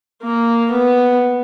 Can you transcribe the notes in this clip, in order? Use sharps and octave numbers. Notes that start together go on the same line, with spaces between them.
A#3
B3